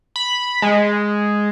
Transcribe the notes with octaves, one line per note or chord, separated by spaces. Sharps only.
B5
G#3